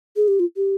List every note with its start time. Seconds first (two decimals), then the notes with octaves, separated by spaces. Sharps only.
0.16 G#4
0.28 G4
0.40 F4
0.57 G4